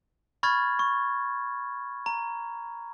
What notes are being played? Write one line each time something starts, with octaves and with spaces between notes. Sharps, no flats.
B5 C#6 F6 G#6 A6
C#6
A#5